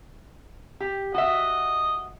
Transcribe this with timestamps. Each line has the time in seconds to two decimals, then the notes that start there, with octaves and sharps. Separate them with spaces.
0.80 G4
1.14 F#4 D#5 E5